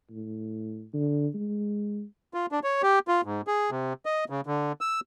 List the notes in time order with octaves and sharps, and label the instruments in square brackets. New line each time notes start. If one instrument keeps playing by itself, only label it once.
[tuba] A2
D3
G#3
[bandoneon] F4
D4
C#5
G4
F4
G#2
G#4
C3
D#5
C#3
D3
E6